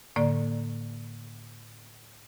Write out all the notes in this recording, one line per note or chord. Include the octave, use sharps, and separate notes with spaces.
A2 D3 A#3 D5 C#6